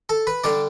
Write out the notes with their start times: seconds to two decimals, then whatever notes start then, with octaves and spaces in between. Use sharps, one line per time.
0.09 A4 A5
0.27 B4 B5
0.44 D3 G3 D4 D5 D6